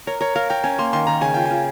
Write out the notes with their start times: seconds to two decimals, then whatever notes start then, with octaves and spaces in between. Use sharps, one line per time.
0.07 A#4 C#5
0.21 A#4 C#5
0.36 A#4 F5
0.50 A#4 G5
0.64 C#4 G#5
0.79 A#3 C6
0.93 D#3 C6
1.07 D#3 A#5
1.21 C#3 G#5
1.34 F4 G5
1.46 F4 G#5